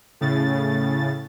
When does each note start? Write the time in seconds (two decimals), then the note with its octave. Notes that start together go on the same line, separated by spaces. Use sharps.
0.21 A2 C#3 A6